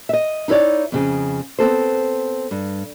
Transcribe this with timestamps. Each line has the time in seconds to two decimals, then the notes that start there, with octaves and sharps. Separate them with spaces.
0.09 D#5 E5
0.48 D#4 E4 B4 C#5 D5
0.92 F2 C#3 G#4
1.59 B3 C4 A4 C5
2.51 G2